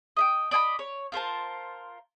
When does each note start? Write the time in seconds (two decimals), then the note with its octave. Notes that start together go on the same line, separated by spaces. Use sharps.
0.17 D#5 E5 G5
0.51 D5 D#5 G#5 B5
0.79 C#5
1.12 F4 A#4 C5 A5